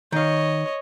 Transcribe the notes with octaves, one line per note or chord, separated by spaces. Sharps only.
D#3 C#5 D#5 F5